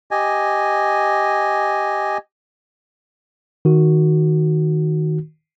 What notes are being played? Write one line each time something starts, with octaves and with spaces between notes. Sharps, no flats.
G4 D#5 G#5
D#3 F#4